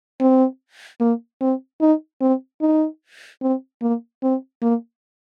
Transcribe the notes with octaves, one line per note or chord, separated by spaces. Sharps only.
C4
A#3
C4
D#4
C4
D#4
C4
A#3
C4
A#3